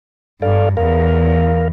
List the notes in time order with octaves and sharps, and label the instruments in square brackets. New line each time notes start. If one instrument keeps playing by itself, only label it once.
[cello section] G2 [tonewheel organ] A4 D5 F5
[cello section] E2 [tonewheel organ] A#4 F5